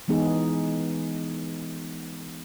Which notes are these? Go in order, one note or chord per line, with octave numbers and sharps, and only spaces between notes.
E3 G#3 B3 D#4 G#4